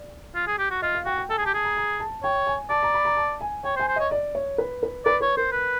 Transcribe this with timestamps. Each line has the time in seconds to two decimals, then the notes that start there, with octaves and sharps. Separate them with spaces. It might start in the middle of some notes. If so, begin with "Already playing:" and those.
Already playing: D5
0.35 F4
0.47 G#4
0.59 G4
0.71 F#4
0.82 F4 D#5
0.95 F5
1.05 F#4 G5
1.18 G5
1.29 A4 G#5
1.38 G#4
1.42 A5
1.46 G4
1.53 G#4 A5
1.64 A#5
1.77 A#5
2.00 A5
2.23 C#5 G5
2.47 G#5
2.70 D5 A5
2.83 A#5
2.94 B5
3.05 A#5
3.17 A5
3.41 G#5
3.64 C#5 G5
3.76 C5
3.80 G#5
3.88 C5
3.96 C#5 D#5
4.11 D5
4.35 C#5
4.58 B4
4.83 B4
5.05 B4 D5
5.21 B4 C#5
5.37 A#4 C5
5.52 B4